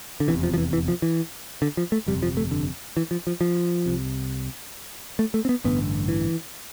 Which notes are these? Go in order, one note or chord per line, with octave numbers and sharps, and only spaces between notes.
D3
F1 E2 C3 E3
F3
F3
E3
E3
F3
E3
D3
F3
A3
G1 F2 C3 G3
F3
A3
D3
E3
F3
F3
F3
C2 C3
A3
A3
C4
B3
A1 G2 D3 B3
E3